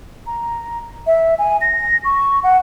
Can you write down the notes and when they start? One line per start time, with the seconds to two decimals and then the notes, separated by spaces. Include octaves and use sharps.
0.27 A#5
1.07 E5
1.39 G#5
1.61 A#6
2.04 C#6
2.43 F#5